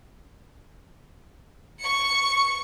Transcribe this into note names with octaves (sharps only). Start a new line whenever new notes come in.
C#6 C#7